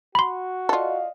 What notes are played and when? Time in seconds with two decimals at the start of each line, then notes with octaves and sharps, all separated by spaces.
0.15 F#4 B5 C6
0.69 F4 A4 D5 D#5 F5